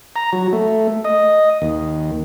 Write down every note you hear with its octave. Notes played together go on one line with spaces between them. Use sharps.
A#5
F#3
A3
D#5
D#2